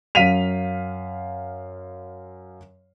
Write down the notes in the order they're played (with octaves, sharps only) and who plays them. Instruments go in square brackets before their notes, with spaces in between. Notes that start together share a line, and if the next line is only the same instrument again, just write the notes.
[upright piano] F#2 F5 B6 D#7 F7